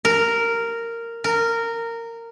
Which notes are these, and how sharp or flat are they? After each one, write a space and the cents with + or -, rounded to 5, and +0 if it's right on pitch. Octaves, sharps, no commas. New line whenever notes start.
A#4 -10
A#4 -15